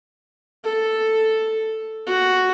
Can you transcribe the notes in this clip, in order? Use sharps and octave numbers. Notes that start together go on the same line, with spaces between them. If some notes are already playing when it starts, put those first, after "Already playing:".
A4
F#4